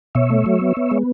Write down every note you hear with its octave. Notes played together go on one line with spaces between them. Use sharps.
B2 C#5 E5
A3
F#3
B3
B3
G#3